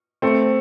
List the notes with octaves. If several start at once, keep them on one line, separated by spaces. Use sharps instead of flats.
A3 C4